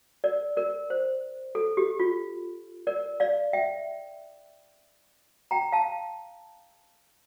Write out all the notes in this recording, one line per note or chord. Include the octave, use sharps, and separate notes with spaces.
A#4 D5
A#4 D5
C5
A4
G4
F4
A#4 D5
D5 F5
E5 G5
G5 A#5
F5 A5